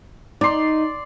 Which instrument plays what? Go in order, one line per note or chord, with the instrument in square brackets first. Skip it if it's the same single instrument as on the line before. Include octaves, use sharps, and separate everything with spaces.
[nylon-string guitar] D#4 [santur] D5 C6